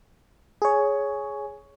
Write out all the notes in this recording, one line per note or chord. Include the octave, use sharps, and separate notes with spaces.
G#4 C#5